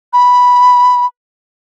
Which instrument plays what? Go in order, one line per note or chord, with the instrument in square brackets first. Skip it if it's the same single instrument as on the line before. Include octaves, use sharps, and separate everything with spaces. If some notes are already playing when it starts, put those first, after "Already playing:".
[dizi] B5